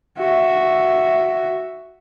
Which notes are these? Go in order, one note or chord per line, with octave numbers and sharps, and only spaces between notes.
F#4 E5